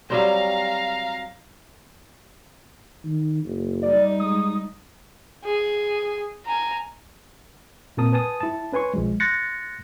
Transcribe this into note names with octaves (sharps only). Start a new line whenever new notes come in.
F#3 G3 C4 F5 A#5
D#3
F#1
G3 D#4 D5
G#3 D#6
G#4
G#5 A#5
A#2 A#3 C4 A#4 A5 D#6
B4 G#5 A5 D#6
E4 A5
C#4 B4 G#5 C6 C#6
B1 F3 G#3
C6 F#6 G6 A6 A#6 C#7